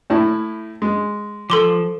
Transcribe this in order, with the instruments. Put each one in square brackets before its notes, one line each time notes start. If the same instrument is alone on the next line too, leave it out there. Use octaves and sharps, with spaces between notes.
[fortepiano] A2 E4
G#3
[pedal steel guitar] F3 [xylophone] A4 C6 D6